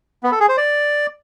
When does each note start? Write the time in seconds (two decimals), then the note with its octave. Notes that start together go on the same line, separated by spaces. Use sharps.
0.23 B3
0.32 A4
0.40 G#4
0.49 C5
0.57 D5